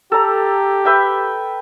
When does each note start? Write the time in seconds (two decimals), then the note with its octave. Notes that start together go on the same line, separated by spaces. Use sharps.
0.12 G4 A4 A#5
0.85 B4 E5 G5